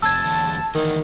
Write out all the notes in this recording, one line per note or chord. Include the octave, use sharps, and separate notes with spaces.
F2 C3 A5 E6 G#6
E2 D3
D2 D#3 E3